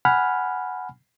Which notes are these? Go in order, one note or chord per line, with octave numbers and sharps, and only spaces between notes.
F#5 G#5 B5 F6